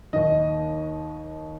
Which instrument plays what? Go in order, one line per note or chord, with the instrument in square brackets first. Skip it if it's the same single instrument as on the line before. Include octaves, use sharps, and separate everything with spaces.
[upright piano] D#2 D#3 D#5